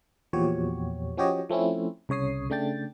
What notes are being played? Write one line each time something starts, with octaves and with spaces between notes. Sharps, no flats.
E2 A#2 F3 F#4 G4 C#5
F3 C#4 F#4 G4 C#5 D#5
F3 A3 C4 C#4 E4
C2 C#3 C#5 D#6 C7
C#3 A3 D4 G5 A6